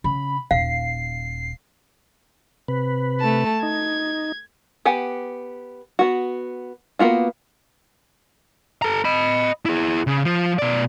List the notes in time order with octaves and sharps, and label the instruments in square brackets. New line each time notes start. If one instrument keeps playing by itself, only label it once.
[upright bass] C#3 [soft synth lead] B5
[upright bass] D#1 [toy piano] F5 [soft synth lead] C7
[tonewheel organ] C3 B4
[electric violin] A3 A5
[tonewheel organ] D#4 [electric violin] G#6
[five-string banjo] B3 G4 F#5 G#5
B3 F#4
A#3 B3 F4 F#4
[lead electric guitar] A4 A#5
D#5 B5
E4 G#4
C#3
F3
B2 D5